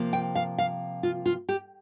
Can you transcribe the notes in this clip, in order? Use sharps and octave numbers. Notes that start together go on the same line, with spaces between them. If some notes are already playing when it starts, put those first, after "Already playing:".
Already playing: C3 F3 A#3
G5
F5
F5
F4
F4
G4